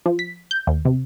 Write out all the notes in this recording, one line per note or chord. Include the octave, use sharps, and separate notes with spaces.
F3
B6
G6
D#2
C3